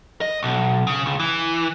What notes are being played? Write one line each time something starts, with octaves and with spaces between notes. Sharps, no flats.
D#5
B1
C#3
C#2
E3